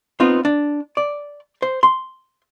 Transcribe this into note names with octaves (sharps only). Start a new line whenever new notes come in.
B3 C4 D#4 F4
D4
D5
C5
C6